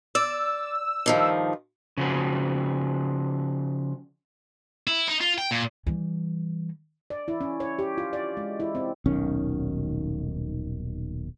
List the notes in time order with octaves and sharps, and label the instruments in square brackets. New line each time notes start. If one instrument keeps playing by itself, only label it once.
[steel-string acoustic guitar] D5 [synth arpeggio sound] E6
[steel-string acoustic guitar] G2 D#3 F3
[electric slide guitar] C#3 F3 F#4
[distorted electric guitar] E4
D#4
F4
G5
A#2
[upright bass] E3 G3
[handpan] D5
E4
C#4
C#5
G4
F4
D5
G#3
E4
C4
[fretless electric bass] D#1 B1 D#3 C#4